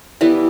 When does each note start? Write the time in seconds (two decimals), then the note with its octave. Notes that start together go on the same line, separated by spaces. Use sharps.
0.21 E3 G3 B3 E4